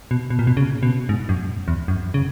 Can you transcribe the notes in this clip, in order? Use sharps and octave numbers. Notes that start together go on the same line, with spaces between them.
B2
B2
A#2
B2
C#3
B2
G#2
F#2
E2
F#2
C#3